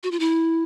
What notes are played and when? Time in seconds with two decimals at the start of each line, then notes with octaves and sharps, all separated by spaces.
0.03 F#4
0.11 F4
0.20 E4